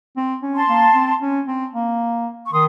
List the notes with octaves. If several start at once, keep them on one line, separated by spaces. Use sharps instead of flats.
C4
C#4
A5 C6
A#3
C4
C#4
C4
A#3
C#6
D#3 C6 D#6